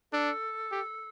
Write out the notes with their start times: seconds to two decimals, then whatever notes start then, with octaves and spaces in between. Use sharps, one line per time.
0.12 D4 A4
0.71 G4